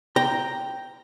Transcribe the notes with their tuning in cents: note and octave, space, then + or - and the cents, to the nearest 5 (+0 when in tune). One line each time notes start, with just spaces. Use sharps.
G5 +0 A#5 +0